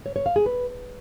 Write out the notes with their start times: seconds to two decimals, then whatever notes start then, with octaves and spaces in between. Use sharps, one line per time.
0.06 C#5
0.16 C#5
0.26 F5
0.36 G#4
0.46 B4